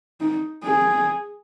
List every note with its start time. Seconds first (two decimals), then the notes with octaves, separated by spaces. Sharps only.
0.21 D#4
0.64 G#4